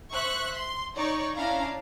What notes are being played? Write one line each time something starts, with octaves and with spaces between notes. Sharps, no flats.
C5 E5 C#6 F#6
C6
D#4 C#5 D5 C#6
C#4 D4 E4 F5 A#5